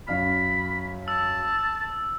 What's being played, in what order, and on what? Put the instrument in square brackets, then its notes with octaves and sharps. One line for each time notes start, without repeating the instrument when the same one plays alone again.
[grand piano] F#2 F5 F6 [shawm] B5
[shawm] A5 [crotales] E6